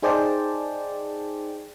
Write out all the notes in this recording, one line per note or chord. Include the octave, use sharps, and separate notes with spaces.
D#4 G#4 C5 D5 G5 A5